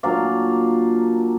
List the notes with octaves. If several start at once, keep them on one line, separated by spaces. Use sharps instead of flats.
A#2 F#3 A#3 D4 D5 F5